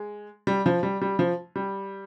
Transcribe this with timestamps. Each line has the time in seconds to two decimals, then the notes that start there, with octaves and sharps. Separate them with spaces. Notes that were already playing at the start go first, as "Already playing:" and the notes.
Already playing: G#3
0.47 G3
0.66 F3
0.83 G3
1.01 G3
1.19 F3
1.56 G3